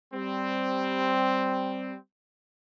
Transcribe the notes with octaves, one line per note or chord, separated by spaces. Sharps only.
G3 C4